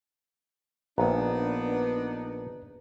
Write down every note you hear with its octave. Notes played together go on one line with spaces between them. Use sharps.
A#1 B3 D4 D#4 B4 A#5